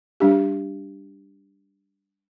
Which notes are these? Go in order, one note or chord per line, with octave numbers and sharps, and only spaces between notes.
G3 D4 G4